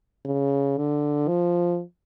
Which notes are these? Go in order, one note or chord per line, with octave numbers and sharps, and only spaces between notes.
C#3
D3
F3